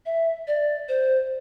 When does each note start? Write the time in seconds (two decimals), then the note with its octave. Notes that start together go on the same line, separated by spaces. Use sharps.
0.06 E5
0.47 D5
0.88 C5